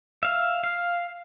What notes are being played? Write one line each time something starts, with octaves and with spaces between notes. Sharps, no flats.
E5 F5
F5